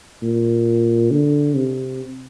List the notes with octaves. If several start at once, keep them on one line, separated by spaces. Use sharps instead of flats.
A#2
D3
C3